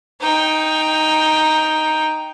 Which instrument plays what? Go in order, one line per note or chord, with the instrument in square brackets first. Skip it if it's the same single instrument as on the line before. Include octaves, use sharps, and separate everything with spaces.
[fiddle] D#4 G5